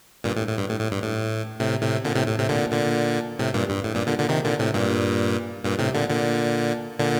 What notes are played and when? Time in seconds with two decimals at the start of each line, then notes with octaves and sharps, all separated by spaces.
0.24 G2 A#2
0.36 A2
0.47 A2
0.58 G2
0.70 A2
0.80 A2
0.91 G2
1.03 A2
1.60 A2 C3
1.81 A2 C3
2.05 A#2 D3
2.15 A2 C3
2.27 A2
2.38 A2 C3
2.49 A#2 D3
2.72 A#2 D3
3.39 A2 C3
3.54 G2 A#2
3.70 G2
3.84 A2
3.95 G2 A#2
4.07 A#2 D3
4.18 A#2 D3
4.29 C3 D#3
4.44 A#2 D3
4.59 A2 C3
4.74 G2 A#2
5.64 G2 A#2
5.79 A2 C3
5.94 A#2 D3
6.10 A#2 D3
6.99 A#2 D3